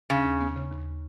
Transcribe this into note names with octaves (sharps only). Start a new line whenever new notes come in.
D#2 C#3
D#2
B3
C#3
D#2